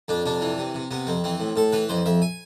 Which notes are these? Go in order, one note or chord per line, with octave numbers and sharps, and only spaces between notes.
F2 D4
C3 D4
E3
C3
C3
C3 B3
F2 C4
E3 C4
A2
A2 A4
E3 B4
F2 C5
F2 E5
G#5